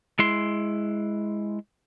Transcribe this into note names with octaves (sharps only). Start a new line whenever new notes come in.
G#3 E4 C6